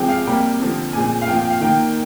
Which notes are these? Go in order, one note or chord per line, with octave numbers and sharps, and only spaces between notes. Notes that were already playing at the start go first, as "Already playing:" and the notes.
Already playing: C3 F3 G#3 C4 G5
F5
C3 G3 A#3 G5
D3 F3 C4
A#2 G#3 C4 G#5
F5
A#2 F3 C4 G5
G5
F5
D#3 A#3 G5